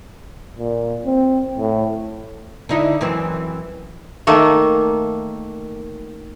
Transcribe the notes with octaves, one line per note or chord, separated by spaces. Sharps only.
A#2
C4
A2
D3 D#4 E4
F#2 E3 C4
D#3 A3 A#3